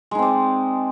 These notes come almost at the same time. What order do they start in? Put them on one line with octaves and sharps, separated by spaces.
G#3 D#4 C4 D5